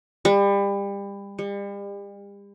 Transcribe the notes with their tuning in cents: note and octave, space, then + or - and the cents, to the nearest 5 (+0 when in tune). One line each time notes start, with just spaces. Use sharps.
G3 +30
G3 +40